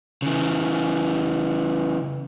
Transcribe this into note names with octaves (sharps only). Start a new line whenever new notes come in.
C#3 E3